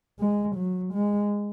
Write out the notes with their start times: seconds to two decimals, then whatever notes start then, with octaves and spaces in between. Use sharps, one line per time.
0.20 G#3
0.56 F#3
0.94 G#3